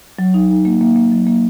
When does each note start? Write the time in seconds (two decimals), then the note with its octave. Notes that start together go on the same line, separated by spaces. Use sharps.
0.19 F#3
0.34 D#4
0.50 D#4
0.65 A#3
0.81 A#3
0.96 A#3
1.12 F#3
1.27 A#3